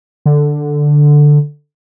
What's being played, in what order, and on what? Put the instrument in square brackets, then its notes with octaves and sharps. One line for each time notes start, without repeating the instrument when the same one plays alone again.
[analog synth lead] D3